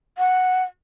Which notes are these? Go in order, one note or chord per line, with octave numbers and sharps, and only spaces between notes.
F#5